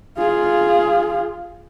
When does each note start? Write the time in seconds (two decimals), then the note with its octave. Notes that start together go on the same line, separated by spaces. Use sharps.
0.18 F4 G#4